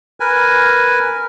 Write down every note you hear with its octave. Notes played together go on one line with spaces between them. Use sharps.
A#4 B4 G#5